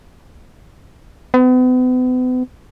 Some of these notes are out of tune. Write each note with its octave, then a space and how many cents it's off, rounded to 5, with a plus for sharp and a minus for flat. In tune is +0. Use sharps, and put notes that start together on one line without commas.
B3 +40